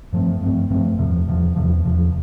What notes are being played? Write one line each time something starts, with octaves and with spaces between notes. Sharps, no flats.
G2 F3 A3 C4
G2 F3 A3 C4
G2 F3 A3 C4
E2 C3 F3
E2 C3 F3
E2 C3 F3
E2 C3 F3